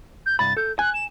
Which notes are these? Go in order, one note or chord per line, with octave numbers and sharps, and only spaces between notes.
G6
C2 G2 B5 A6
A4 G6
G#5 F#6
E7